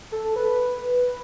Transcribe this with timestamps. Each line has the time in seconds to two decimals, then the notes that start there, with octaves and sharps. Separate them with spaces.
0.12 A4
0.36 B4